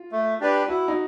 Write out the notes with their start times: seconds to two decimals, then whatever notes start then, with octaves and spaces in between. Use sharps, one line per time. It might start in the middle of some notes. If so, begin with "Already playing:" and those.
Already playing: F4
0.12 A3
0.40 D4 G4 B4 D5
0.68 E4 F#4
0.88 D#4